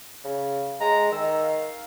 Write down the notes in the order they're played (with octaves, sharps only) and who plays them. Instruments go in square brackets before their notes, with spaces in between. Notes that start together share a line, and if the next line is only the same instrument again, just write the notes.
[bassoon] C#3
[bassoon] G#3 [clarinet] A#5
[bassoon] D#3 [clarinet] E6
[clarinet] F5